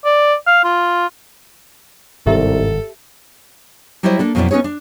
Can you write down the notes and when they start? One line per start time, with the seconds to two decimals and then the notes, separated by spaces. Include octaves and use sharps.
0.05 D5
0.47 F5
0.64 F4
2.26 G1 C2 G#2 D#3 G4 A4 E5
4.03 F#3 G3 E4 F#4 C5 D#5
4.19 A#3 D4 A4
4.35 F2 B2 F#3 C#4 E4 D5
4.51 B3 C#4 D#4 G#4 C#5
4.64 D4